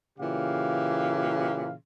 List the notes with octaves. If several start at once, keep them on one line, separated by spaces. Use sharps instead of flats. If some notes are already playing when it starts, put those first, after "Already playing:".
A#2 C#3 E3 G4 F5